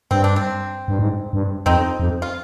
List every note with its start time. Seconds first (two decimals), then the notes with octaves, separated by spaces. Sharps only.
0.11 G2 C4
0.24 D4
0.36 C4
0.88 G2
0.99 G#2
1.33 G2
1.66 F2 C4 D#4
2.00 F2
2.22 F4